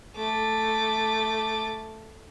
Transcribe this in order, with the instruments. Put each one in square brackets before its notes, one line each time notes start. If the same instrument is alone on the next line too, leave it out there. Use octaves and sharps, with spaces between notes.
[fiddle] A3 D6